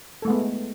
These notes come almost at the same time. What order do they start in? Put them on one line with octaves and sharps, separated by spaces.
A4 A3 G#3 B3